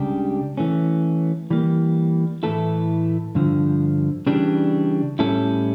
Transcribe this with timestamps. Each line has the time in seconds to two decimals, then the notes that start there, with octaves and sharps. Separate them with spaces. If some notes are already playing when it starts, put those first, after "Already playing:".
Already playing: C#2 C#3 G3 D4 G4
0.57 E3 A3 C#4
1.50 E3 G3 A#3
2.43 A2 E3 A3 E4 A4
3.35 G2 D3 F3
4.27 C#3 E3 G3 D4
5.19 A2 G3 C#4 E4 A4